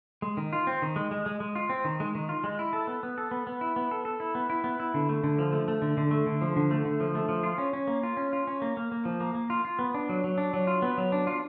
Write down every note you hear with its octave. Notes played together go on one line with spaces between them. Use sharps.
G#3
D#3
F4
C4
D#3
G#3
G#3
G#3
G#3
F4
C4
D#3
G#3
D#3
F4
G#3
E4
A4
B3
B3
A4
B3
B3
E4
B3
A4
A4
E4
B3
E4
B3
E4
D3
A3
D3
F3
A3
A3
D3
D3
A3
D3
F3
D3
A3
D3
F3
A3
F3
F4
C#4
C#4
A#3
F4
C#4
F4
C#4
A#3
A#3
A#3
F3
A#3
A#3
F4
F4
B3
D4
F#3
F#3
D4
F#3
F4
B3
F#3
D4
F4